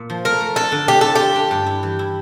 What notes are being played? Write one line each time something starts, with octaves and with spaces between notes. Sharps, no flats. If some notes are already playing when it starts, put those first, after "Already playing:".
Already playing: A#2
F3
A3 A#4
A3
D4 A4
D3
A3 G4
F4 A4
F4 G4
D4
G2
E4
E3
E4